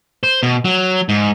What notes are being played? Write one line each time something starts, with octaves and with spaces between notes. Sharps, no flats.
C5
B2
F#3
G#2